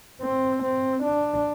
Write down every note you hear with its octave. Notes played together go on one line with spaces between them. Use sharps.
C4
C4
D4